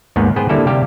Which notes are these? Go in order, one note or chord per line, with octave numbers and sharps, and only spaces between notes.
D#2 G#2 D#3 B3 D#4
B3 G#4 B4 C5 G5
D3 G3 A#3 E4 A4
C3 G3 G4 F5 G5